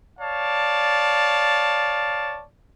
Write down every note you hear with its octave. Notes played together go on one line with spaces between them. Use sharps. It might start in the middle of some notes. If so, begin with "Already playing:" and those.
C#5 D5 F5 A5